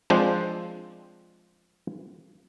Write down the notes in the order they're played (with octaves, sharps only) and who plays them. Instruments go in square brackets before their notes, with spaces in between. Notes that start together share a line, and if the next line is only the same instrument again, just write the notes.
[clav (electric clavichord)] F3 G#3 C4 D4 C5